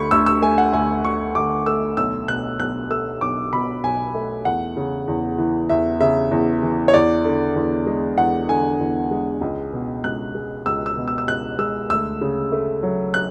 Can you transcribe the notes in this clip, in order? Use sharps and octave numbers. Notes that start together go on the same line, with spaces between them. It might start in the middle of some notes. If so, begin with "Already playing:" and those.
Already playing: D2 D3 B5 C#6
D2 E6
E6
A3 G#5
F#5
D2 G#5
D3 C#6
D2 D6
A3 E6
B1 E6
B2 F#6
B1 F#6
A3 E6
B1 D6
B2 B5
B1 G#5
A3
E2 F#5
C#3
E2
E3
E2 E5
C#3 E5
E2
E3
C#5
E2 D5
D3
E2
G#3
E2 F#5
D3 G#5
E2
G#3
C#2
B2
C#2 F#6
G#3
C#2 E6
E6
B2
E6
E6
C#2 F#6
G#3 E6
D2 E6
C#3
A3
F#3
F#6